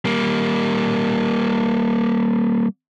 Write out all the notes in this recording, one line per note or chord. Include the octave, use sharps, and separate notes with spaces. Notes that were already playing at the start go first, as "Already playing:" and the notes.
G3 A#3